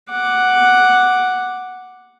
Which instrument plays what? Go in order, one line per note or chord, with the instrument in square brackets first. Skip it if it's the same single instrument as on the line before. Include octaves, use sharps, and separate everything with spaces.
[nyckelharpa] F#5 D6